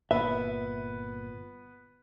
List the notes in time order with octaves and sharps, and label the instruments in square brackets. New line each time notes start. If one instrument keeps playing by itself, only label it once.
[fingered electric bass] G1 A#2 [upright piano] B3 B4 [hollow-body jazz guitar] E5